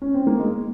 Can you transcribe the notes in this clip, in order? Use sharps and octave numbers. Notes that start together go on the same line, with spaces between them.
C#4
C4
A#3
G#3